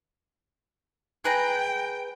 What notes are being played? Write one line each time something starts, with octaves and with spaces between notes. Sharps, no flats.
G#4 B4 G5 A#5